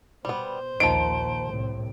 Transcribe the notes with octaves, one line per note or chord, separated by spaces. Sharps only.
B2 G3 B3 C5
A#1 D#2 A#2 D#3 F3 D7
C2 A2 C3